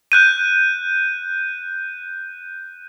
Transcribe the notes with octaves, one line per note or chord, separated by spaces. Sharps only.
F#6 G6 D#7